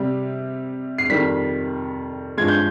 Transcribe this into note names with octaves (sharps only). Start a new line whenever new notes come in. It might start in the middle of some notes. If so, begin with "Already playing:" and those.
Already playing: C3 G3
C7
F2 D#3 G3 B6
G2 F3 G#3 G#6
G6